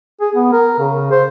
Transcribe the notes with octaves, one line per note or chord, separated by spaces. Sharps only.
G#4
B3
A#4
C#3
C5